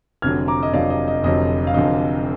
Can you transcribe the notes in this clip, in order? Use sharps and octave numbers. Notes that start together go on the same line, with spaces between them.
F1 F2 D3 F#3 F6 G#6
A#5 D6
D#5
F1 F2 D3 F#3 D5 F5
D#5
D#5
F1 F2 D3 F#3 D#5
F5
F1 F2 D3 F#3 D#5